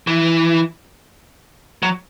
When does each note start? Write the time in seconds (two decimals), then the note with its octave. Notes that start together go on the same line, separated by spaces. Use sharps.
0.07 E3
1.83 F#3